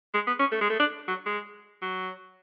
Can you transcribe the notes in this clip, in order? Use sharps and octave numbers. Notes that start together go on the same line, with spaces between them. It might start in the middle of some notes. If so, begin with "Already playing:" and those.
G#3
B3
C#4
A3
G#3
A3
D4
F#3
G#3
F#3